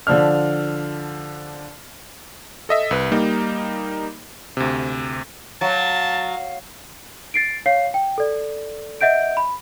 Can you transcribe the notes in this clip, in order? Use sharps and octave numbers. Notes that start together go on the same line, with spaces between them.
D3 F3 D4 F6
A4 D#5 E5
C2 B4
G3 A#3 D#4
D2 C3
F#3 F5 A5
A6 C7 D7
C#5 F5 C7
G5
A4 D5
D#5 E5 F#5 G6 D7
B5